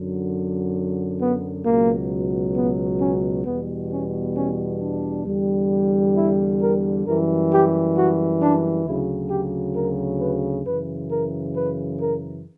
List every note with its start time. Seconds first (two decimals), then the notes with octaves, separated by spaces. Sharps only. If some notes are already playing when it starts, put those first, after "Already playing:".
Already playing: F#2 D3 F#3
1.21 B3
1.66 C#2 B2 F#3 A#3
2.56 B3
3.00 C#4
3.46 E2 B2 G3 B3
3.91 C#4
4.36 C#4
4.81 D4
5.26 E2 D3 G3
6.16 E4
6.60 A#4
7.06 F#2 E3 G3 A#4
7.51 G4
7.96 F#4
8.41 D4
8.85 D2 C#3 F#3 E4
9.30 G4
9.76 A#4
10.21 B4
10.66 F#2 C#3 E3 B4
11.11 A#4
11.56 B4
12.01 A#4